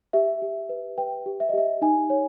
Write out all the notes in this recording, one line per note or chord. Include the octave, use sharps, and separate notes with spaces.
G4 E5
G4
B4
B4 G5
G4
E5
D#5
G4 E5
D#4 G#5
C#5